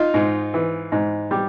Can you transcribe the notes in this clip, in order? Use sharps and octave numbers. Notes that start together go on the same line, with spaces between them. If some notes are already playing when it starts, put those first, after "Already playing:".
Already playing: D#4 F4
G#2
E3
G#2
G3